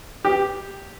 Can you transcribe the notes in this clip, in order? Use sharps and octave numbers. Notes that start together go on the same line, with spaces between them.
G4